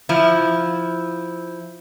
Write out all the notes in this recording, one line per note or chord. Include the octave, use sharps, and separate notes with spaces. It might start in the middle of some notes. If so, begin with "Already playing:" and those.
F3 E4